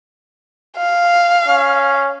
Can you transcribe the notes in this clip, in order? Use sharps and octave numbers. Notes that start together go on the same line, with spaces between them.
F5
C#4